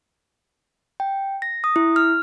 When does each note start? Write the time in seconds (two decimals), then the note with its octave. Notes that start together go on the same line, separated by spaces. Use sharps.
1.00 G5
1.42 A#6
1.64 D#6
1.76 E4
1.96 F6